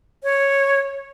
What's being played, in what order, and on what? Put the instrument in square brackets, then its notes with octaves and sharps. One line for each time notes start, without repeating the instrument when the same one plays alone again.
[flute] C#5